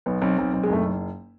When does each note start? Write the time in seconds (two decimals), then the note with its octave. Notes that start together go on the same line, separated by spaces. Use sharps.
0.06 B1 B3
0.22 B1 C4
0.38 B1
0.53 B1
0.63 G#3
0.69 F#1 A3